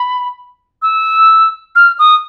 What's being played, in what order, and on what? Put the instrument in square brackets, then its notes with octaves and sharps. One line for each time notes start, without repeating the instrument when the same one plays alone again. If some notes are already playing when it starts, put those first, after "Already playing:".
Already playing: [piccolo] B5
E6
F6
D#6